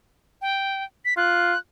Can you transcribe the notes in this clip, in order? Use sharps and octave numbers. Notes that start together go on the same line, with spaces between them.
G5
B6
F4 F#6